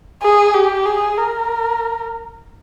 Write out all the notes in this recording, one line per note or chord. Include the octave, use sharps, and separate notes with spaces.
G#4
G4
G#4
A#4